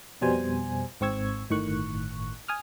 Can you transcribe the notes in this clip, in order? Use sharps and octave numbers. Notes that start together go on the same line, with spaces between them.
F2 B2 G3 C5 G#5
G#1 G#2 C4 C#6 E6 G#6
G1 A2 D#3 C#6 F#6
G#5 D#6 F6